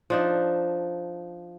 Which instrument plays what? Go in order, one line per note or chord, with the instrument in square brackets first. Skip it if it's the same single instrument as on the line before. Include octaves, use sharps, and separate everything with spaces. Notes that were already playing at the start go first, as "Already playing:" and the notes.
[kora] F3 D4 D#4